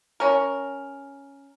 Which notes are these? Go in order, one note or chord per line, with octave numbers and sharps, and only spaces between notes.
C#4 A#4